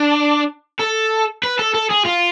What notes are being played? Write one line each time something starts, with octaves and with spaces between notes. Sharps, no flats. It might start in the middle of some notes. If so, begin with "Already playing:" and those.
Already playing: D4
A4
B4
A4
A4
G#4
F4